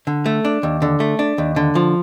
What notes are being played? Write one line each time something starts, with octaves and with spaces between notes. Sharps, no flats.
D3
A3
D4
D#2
D3
A3
D4
D#2
D3
F3